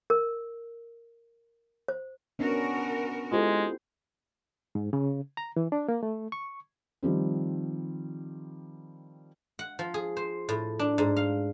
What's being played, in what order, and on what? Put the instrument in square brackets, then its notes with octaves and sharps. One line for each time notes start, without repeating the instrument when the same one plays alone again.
[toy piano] A#4
C5
[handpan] B3 C#4 D4 [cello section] F#4 A#4
[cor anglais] G#3 [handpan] E4 G4 C5 [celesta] F4 A4
[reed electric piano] G#2
C#3
A#5
E3
D4
A#3
A3
C#6
[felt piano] D#3 F3 G3 C4
[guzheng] F#5
F3
G#4
C5
A2
D4
G#2
F5